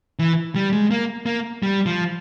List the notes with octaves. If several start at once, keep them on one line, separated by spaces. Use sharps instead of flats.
E3
G3
G#3
A#3
A#3
G3
F3